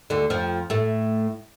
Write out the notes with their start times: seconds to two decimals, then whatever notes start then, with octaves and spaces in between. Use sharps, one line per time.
0.10 D2 D3
0.30 F2 F3
0.70 A2 A3